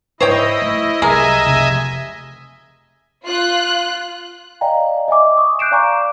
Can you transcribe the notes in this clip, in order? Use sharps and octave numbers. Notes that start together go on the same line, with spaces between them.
G#2 E4 C5 C#5 D#5 G5
A3
C2 F#3 G#3 A#4 D#5 E5 G#5
F1 C3
F4 F#6
D5 D#5 F5 G5 G#5 A#5
D#5 E5 G#5 D6
C#6 D#6
F#6 G6 C7 D7 E7
D5 F5 G#5 A#5 C#6 D6